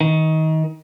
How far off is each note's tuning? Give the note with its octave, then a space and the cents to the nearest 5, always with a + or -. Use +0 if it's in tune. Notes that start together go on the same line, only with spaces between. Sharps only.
D#3 +25